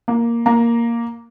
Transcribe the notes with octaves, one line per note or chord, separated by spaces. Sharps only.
A#3
A#3 A#5